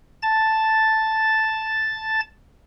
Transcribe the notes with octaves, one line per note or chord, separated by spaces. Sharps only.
A5 A6